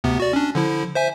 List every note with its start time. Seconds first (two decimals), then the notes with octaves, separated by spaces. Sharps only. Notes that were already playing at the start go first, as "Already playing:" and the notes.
0.04 D2 C3 B3
0.20 F#4 D5
0.33 C#4 D4
0.55 D3 F3 E4
0.95 C5 E5 G#5